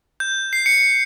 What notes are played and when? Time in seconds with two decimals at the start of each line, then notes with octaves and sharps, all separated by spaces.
0.20 G6
0.53 C7
0.66 C#7